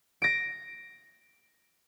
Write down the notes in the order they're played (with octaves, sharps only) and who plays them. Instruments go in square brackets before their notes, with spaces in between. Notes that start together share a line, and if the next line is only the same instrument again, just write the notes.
[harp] A#6 D7